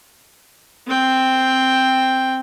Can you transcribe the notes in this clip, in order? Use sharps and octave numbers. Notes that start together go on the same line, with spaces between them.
C4 G5